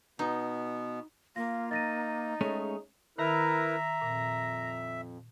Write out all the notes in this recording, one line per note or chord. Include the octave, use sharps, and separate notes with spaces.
B2 B3 D#4
A#3 F4 A#6
D#4 A6 A#6 D#7
G#3 A3 C#4 G#4
D#3 E4 A#4 B4 E5 A#5
F2 A#2